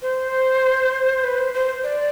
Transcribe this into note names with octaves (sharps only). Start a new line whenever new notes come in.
C5
B4
C5
C5
D5